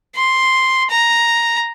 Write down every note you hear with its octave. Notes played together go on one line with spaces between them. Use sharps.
C6
A#5